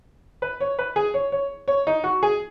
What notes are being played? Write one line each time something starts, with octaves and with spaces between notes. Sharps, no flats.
B4
C#5
B4
G#4
C#5
C#5
C#5
D#4
F#4
G#4